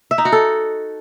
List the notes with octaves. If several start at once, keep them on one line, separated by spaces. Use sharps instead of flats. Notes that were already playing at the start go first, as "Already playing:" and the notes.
E5
D#4
F#4
A4